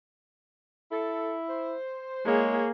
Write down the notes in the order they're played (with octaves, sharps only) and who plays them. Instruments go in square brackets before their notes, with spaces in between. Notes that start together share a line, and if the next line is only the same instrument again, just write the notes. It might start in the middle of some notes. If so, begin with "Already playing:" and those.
[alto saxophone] E4 [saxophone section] A4
[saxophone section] C5
[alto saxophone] G#3 [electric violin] A#3 G#4 [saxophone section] C4 E4 C#5